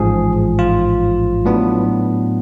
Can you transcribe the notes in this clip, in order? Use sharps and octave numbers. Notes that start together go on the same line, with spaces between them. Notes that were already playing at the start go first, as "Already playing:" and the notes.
Already playing: A1 G#2 F3 G#4
F4
A2 F#3 B3 D4